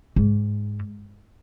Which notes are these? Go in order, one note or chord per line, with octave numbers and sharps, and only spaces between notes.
G#2